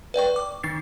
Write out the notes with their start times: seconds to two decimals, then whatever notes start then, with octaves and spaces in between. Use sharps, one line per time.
0.14 B4 D5 G5 C#6
0.36 D6
0.63 D#3 D#4 A6 C7